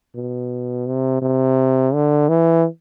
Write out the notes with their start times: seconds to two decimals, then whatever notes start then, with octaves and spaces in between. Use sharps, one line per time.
0.15 B2
0.87 C3
1.22 C3
1.94 D3
2.29 E3